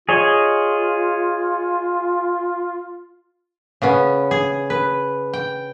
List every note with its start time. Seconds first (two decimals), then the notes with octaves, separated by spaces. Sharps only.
0.09 F4 G#4 C#5 D#5
3.82 C#3 B3 C#4
4.31 G#4
4.70 B4
5.33 G5